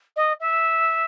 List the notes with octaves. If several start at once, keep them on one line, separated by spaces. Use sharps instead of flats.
D#5
E5